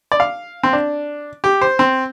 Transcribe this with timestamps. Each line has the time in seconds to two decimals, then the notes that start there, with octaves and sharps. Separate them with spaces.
0.12 D5
0.20 F5
0.63 C4
0.73 D4
1.44 G4
1.61 C5
1.79 C4